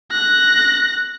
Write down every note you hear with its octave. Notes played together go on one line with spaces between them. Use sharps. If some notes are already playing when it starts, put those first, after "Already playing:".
F#6 A#6